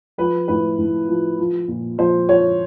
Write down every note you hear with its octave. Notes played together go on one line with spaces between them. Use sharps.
F3 B4
A2 B4
A2
F3
F3
A#2
F3 C5
F3 C#5